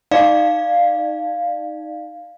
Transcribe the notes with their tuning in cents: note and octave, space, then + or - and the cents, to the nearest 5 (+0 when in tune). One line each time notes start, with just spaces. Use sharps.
D#4 +0 D5 +25 F5 +0